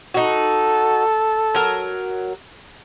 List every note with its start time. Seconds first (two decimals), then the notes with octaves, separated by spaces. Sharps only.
0.14 D#4 F#4 A4
1.54 F#3 A#4